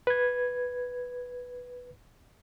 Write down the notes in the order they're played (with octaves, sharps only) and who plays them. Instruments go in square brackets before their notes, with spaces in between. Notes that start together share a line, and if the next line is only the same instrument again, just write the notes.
[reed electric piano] B4 G#6